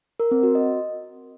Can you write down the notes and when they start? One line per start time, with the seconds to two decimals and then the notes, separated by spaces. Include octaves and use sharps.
0.20 A#4
0.31 C4
0.43 F#4
0.55 D#5